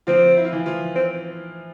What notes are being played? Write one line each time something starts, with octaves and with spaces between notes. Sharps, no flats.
F3 C4 F4
E4
F4
E3 E4
F3 F4
C4